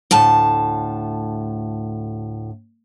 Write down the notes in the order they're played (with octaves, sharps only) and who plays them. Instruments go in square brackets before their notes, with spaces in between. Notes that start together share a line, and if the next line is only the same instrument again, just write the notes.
[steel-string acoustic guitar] D2 A2 A5